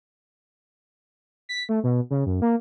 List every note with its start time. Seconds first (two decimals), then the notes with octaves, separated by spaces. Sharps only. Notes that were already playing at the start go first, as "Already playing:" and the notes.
1.49 B6
1.69 A3
1.84 B2
2.10 C#3
2.26 F#2
2.42 A#3